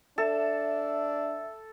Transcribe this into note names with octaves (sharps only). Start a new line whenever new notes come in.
D4 A4 E5